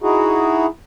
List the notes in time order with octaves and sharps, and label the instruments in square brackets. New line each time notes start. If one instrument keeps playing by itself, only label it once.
[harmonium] D#4 E4 F#4 G#4